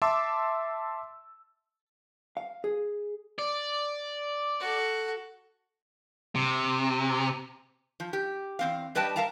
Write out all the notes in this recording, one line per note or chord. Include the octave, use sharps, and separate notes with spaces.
E5 A5 C6 D6 E6
F5
G#4
D5
F#4 A4
C3
F3
G4
E2 C4 F5
G2 G3 B4 D#5 G5 A5
A#4 E5 F5 A5 A#5